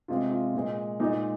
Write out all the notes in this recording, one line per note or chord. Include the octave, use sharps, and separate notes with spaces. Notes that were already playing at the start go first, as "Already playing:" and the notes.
C3 G#3 F4
F4
A#2 G#3
A#2 G#3 D#4